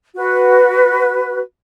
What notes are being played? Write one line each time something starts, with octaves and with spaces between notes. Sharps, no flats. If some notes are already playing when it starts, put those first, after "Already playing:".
F#4 B4